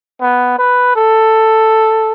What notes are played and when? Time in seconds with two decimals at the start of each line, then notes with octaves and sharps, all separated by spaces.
0.21 B3
0.59 B4
0.96 A4